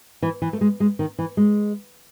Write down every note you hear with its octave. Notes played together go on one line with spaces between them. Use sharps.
E3
E3
A3
G#3
G#3
D#3
E3
G#3